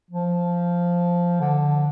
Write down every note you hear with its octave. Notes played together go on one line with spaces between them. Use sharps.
F3
D3